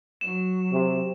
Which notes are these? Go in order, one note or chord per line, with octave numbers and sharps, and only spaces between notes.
F#3 E7
C3